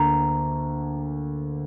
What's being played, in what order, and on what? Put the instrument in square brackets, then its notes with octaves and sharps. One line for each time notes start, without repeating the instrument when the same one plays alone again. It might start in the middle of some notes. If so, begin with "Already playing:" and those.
Already playing: [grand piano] D2 D3 A#3 [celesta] A#5